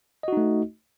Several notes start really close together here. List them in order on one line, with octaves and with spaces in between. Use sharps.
D#5 F#4 D#4 A3